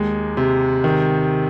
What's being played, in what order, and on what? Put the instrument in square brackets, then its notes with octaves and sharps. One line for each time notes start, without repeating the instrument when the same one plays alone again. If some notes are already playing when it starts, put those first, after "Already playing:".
Already playing: [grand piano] D#2 G#3
C3
D#3